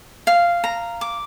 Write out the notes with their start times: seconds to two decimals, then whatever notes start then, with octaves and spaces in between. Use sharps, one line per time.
0.27 F5
0.64 A#5
1.01 D6